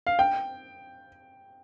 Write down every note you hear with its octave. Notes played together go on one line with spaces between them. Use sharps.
F5
G5